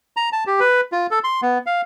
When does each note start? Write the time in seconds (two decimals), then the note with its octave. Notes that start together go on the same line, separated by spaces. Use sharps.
0.17 A#5
0.32 A5
0.47 G4
0.60 B4
0.92 F4
1.11 A4
1.24 C6
1.42 B3
1.66 F5